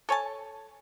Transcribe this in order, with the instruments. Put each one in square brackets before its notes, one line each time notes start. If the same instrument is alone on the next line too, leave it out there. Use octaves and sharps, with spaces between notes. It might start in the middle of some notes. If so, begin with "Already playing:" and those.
[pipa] A4 C#5 G#5 A5